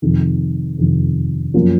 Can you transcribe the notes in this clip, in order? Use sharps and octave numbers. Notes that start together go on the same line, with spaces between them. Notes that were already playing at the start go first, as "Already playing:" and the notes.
F2 C3 D#3
F2 C3 D#3
F#2 F3 A#3 C#4 F4